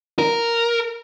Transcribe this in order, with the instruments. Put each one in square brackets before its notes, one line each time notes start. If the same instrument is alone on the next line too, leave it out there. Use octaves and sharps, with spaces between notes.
[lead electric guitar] A#4